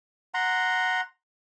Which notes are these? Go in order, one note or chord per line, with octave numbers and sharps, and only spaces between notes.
F#5 A#5 C6